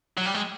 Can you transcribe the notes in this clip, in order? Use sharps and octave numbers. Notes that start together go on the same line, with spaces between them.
F#3
G3
G#3